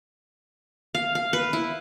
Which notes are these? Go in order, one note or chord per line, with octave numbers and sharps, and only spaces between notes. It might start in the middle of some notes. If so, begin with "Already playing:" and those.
F5
F5
B4
E4